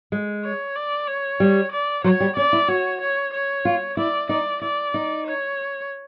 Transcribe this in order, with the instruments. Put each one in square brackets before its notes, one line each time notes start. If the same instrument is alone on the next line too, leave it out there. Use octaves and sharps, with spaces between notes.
[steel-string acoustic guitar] G#3
[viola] C#5
D5
C#5
[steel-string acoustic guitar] G3
[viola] D5
[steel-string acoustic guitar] F#3 [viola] C#5
[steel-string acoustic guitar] G3
[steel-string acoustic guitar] C#4 [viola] D5
[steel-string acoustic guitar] E4
[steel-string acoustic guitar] F#4 [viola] C#5
[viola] C#5
C#5
[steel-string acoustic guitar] F4
[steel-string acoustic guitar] E4 [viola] D5
[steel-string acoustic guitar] D#4 [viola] D5
[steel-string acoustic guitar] E4 [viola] D5
[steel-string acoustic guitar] D#4
[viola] C#5